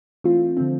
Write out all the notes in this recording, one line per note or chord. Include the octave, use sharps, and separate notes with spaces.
E3 A3 C4 F4
D3 F3 A3 C4